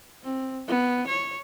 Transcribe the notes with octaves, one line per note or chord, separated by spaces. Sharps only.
C4
B3
C#5